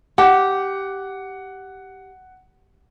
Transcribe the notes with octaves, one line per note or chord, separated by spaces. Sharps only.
G4 F#5